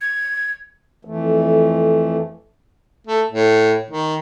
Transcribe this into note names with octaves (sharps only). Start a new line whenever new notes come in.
G#6
F2 E3 A3
A3
A2
D#3